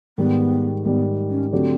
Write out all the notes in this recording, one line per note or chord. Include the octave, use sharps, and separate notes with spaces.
G#2 D#3 G3 B3
G#2 D#3 G3 B3
C#4
D3 F#3 A3 C4 D4 G4